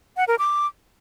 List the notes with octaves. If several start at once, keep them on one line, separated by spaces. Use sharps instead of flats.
F#5
A#4
D6